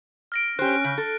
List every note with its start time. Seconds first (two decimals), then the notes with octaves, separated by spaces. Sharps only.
0.32 F6 A#6 D7
0.59 C#4 G4 C5 F#6
0.84 C#3
0.98 A4